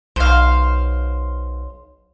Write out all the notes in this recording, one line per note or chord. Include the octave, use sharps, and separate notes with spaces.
B1 C5 F5